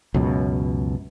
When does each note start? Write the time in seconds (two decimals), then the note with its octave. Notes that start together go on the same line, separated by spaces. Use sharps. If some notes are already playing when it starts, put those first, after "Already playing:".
0.14 C#2 F#2 B2